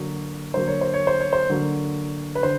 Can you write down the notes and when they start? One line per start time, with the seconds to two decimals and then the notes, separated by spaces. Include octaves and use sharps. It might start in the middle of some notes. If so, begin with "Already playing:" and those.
Already playing: D3 F#3 A#3
0.54 D3 F#3 A#3 C5
0.67 C#5
0.81 C5
0.94 C#5
1.07 C5
1.21 C#5
1.33 C5
1.49 D3 F#3 A#3
2.35 B4
2.43 D3 C5